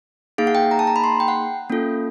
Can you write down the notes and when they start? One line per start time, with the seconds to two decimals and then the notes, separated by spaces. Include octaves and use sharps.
0.38 A#3 D#4 G#4 F5
0.47 F#5
0.55 G5
0.71 A#5
0.79 A5
0.87 A#5
0.96 B5
1.04 C6
1.20 G5
1.28 F#5
1.70 A#3 C#4 F4 A4